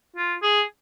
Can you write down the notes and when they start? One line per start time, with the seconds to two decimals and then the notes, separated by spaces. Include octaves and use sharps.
0.16 F4
0.42 G#4